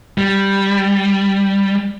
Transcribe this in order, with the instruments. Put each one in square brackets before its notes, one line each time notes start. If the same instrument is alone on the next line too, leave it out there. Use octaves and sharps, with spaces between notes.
[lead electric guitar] G3